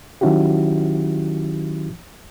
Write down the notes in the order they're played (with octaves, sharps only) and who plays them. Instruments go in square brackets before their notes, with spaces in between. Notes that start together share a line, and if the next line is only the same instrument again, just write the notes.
[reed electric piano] D#3 F#3 C#4 E4 F#4 G4